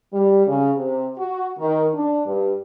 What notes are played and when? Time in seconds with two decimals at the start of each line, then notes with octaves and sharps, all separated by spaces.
0.13 G3
0.47 C#3
0.76 C3
1.18 F#4
1.59 D#3
1.94 D4
2.26 G2